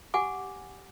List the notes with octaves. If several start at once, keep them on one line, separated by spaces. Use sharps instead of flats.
G4 F#5 G#5 D6